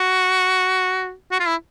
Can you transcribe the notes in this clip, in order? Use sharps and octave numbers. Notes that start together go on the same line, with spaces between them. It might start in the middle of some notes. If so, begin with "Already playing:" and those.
Already playing: F#4
F#4
F4
E4